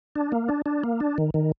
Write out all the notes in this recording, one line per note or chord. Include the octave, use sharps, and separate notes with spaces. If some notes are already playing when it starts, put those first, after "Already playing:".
D4
A#3
D4
D4
A#3
D4
D#3
D#3